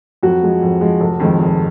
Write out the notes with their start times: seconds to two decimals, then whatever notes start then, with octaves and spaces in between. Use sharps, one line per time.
0.23 F2 F#3 F#4
0.43 F3 G#3
0.62 F2
0.81 F3 G#3
1.00 F1
1.20 F2 D#3 G#3
1.40 F1